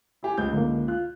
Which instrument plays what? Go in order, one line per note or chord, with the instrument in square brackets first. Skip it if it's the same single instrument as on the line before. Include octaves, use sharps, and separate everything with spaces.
[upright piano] E4 G4 G#5
C#2 G6
[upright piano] C#2 G#2 [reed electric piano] D3 A#3
[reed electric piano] F4 [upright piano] F#6